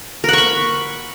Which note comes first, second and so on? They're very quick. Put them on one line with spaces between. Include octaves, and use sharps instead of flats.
A#4 F#5 C#6 B5